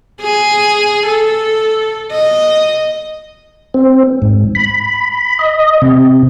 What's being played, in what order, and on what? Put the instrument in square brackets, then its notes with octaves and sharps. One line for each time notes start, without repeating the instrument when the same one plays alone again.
[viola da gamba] G#4
A4
D#5
[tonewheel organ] C4
G#2
B5
B5
D#5
C3